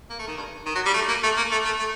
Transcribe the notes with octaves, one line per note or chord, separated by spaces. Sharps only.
A#3
A3
D#3
G2
D#3
F#3
G3
A3
A#3
A3
A#3
A3
A3
A3